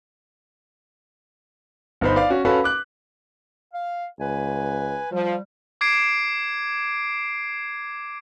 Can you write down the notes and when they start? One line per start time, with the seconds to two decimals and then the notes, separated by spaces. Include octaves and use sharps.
2.01 G1 B3 D#4 C5 B5
2.16 D5 F5
2.30 C#4 F#4
2.45 C#4 F#4 A4 B4 F5 B5
2.64 D6 F#6
3.72 F5
4.20 C#2 B4 G#5
5.12 F3 G3
5.81 D6 G#6 C7 D7